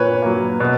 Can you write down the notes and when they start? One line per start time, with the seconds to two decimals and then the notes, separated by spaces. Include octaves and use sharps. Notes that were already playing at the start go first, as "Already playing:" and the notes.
Already playing: A#2 A#3 B4 C#5
0.22 F#3 A#3
0.60 B2